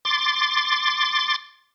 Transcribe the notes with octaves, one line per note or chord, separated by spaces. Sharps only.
C6 D6 A6